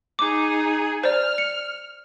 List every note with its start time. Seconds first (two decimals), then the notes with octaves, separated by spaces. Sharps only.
0.19 D#4 G#4 D6
1.04 C5 D5 F6
1.38 C#7